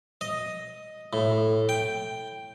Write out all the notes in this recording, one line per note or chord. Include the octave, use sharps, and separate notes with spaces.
D#5
A2
G5